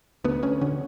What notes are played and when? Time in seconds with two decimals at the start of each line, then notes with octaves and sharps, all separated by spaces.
0.24 D2 B3
0.43 D2 C#4
0.61 D3 C#4